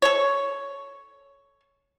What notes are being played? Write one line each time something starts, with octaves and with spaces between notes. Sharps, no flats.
A4 C#5